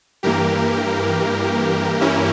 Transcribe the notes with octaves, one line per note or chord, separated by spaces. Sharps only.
G2 E3 A#3 G4 A#4
C#4 E4